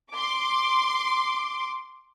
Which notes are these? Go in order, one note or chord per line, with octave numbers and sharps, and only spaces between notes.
C6 D6